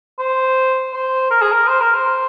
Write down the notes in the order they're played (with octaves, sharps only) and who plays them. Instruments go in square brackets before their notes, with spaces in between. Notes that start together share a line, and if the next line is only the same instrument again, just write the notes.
[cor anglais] C5
C5
A#4
G#4
A#4
C5
A#4
C5